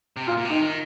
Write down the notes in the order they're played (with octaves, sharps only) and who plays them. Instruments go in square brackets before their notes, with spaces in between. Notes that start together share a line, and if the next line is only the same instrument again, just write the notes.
[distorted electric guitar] C3
[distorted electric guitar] A#2 [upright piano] F4
[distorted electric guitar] A#2
C3
[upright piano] D#4
[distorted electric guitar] D#3